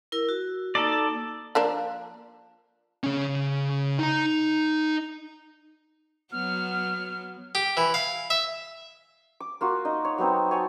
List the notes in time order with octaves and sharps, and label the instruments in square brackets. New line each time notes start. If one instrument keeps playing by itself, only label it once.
[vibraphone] E4 A#4 E6
F#4
[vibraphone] A#3 D#4 [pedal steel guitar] A4 D5
[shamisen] F3 A#3 D4
[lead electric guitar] C#3 C#4
D#4 A#5
[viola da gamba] F#3 B3 [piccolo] F6
[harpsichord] G4
E3
F5
E5
[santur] D6
A#3 F4 F#4
D#4 D#5
C#5
F#3 B3 C4 D#4
C#5 G#5 A5